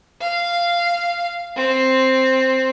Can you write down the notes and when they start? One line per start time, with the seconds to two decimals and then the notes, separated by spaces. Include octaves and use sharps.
0.21 F5
1.56 C4